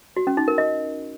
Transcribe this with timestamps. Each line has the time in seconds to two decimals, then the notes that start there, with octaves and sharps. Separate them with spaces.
0.17 F#4
0.27 C#4
0.37 D#4
0.48 A#4
0.58 D#5